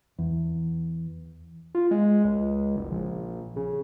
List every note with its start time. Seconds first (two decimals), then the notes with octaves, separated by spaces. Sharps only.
0.19 E2
1.75 F4
1.91 G#3
2.25 C#2
2.76 F#1
2.91 A#1
3.56 C#3